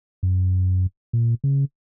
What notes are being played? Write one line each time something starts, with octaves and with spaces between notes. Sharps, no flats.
F#2
A#2
C#3